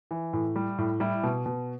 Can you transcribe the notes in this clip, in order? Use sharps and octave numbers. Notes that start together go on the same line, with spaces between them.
E3
A2
G3
A2
G3 E4
B2
B2